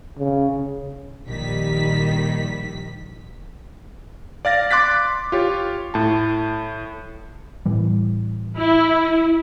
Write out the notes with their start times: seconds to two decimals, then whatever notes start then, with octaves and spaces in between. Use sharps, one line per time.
0.18 C#3
1.26 A#1 D#3 G3 B6
4.45 D5 F5 A6 A#6
4.71 C6 D6 F#6 A6 B6
5.32 F4 G4 C#5
5.94 A2 A5
7.66 A2 E3 G3
8.57 E4